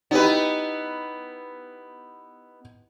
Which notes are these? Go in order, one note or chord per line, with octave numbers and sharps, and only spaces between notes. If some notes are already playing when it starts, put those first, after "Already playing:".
B3 D#4 E4 G4 B4